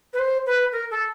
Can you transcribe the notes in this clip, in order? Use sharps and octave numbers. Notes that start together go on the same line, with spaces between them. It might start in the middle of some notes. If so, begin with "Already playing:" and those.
B4
C5
B4
A#4
A4